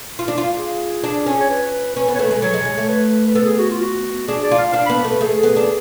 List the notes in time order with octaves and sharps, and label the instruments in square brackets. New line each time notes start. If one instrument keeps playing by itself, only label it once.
[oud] F4
D4
F4
[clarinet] G#4
[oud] D4
C#4
[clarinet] C#5
B4
[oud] C#4 [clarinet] B4
[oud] B3
[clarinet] C#5
[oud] A3 [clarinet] B4
[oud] G#3
[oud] F#3 [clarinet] C#5
[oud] G#3
G#3
A3
[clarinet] B4
B4
[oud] B3 [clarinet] A4
[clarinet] G#4
F#4
F4
F#4
[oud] D4 [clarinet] G#4
[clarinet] D5
[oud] F4
[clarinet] F5
[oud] D4 [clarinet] F5
[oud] B3 [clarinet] B5
[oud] A3 [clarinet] B4
[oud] A3 [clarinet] G#4
[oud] B3
D4